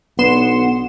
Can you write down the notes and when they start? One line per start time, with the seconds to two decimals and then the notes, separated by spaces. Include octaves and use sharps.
0.19 B1 B3 D4 F#5 C6 E7